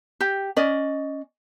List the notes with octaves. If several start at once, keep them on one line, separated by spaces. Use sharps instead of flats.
G4
C#4 D5 D#5